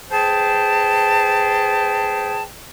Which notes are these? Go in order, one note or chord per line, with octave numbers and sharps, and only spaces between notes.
G#4 B4 C5 G5 A5